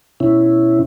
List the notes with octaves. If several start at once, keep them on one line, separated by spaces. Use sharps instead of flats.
B2 C#4 E4